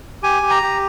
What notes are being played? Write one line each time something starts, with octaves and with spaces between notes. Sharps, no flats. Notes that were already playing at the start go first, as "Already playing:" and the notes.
G4 G#5
G4
A#5
G4